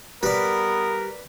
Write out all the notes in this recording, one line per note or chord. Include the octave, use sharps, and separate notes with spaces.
G3 B3 A#4 B4 D5